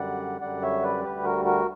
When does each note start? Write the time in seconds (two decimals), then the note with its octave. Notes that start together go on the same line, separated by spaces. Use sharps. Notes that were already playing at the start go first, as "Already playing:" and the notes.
Already playing: F#2 D3 G3 D5 F#5
0.41 F#2 D3 G3 D5 F#5
0.62 C#5 E5
0.83 B4 D5
1.03 D2 D3 G3 G4 B4
1.24 F#4 A#4
1.45 F#4 A#4